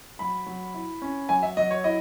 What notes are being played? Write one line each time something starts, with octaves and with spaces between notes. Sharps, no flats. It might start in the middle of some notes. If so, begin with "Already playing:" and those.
F#3 B5
F#3
E4
C#4
F#3 G#5
E5
F#3 D#5
C#5
E4 D#5